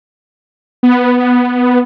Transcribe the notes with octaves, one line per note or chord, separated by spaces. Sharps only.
B3